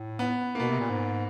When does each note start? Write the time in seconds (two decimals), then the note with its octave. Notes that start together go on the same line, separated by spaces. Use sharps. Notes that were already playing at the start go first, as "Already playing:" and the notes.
Already playing: A2
0.19 B3
0.55 A#3
0.60 B2 B3
0.70 C3
0.80 A#2
0.90 G#2